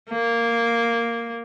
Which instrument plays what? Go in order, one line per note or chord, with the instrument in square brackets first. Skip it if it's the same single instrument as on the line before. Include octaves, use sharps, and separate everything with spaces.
[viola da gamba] A#3